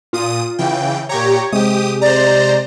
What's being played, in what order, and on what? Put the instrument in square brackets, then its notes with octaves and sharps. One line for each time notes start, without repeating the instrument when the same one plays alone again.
[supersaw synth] A#2 D#6 D#7 [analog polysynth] F4
[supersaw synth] C#3 E3 G5
[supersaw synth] A#2 G4 A#5 [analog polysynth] C#5
[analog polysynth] C3 G#3 [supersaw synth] G4 D#6
[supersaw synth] C5 A#5 [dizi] D5